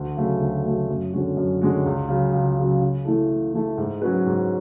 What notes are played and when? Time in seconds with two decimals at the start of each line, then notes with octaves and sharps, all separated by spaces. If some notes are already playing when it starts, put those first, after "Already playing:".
Already playing: D2
0.17 C#3 F#3 A3
0.41 D2
0.65 C#3 F#3 A3
0.88 F#2
1.13 D3 G#3 C#4 F#4
1.37 F#2
1.61 D3 G#3 C#4 F#4
1.86 C#2
2.09 C#3 F#3
2.33 C#2
2.58 C#3 F#3
2.82 C#3
3.05 E3 A3 E4 A4
3.29 C#3
3.54 E3 A3 E4 A4
3.78 G#2
4.02 F#3 C#4 F#4 B4
4.26 G#2